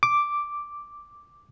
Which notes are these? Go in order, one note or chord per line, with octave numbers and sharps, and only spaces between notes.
D6